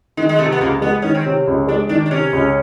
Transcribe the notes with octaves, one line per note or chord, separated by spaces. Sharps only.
D#3 G#3
G#3
C3 A3
B3
C#2 A#3
G#3 B3
D#3 C#4
C4
C3
C#2
G#3 D4
D#3 D4
D4
C3 C#4
C#2